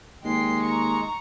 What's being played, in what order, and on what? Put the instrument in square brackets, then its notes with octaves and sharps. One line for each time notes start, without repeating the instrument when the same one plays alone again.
[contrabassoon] D#2 [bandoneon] G#3 [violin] G5 C7
[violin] A#5 C#6